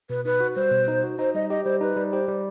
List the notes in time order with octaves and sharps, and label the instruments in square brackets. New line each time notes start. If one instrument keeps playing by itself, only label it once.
[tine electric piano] B2 [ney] B4
[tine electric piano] D#4 [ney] B4
[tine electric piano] F#4
[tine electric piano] G3 [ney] C5
[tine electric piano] B2
D#4
F#4
[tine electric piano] D#4 [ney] C5
[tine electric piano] G3 [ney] D#5
[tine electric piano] G4 [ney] D#5
[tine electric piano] G3 [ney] C5
[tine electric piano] D#4 [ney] B4
[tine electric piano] G3
[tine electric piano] G4 [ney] C5
[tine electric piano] G3